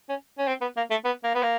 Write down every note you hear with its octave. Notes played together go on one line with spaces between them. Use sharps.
C#4
C#4
C4
B3
A#3
A3
B3
A#3
B3
A#3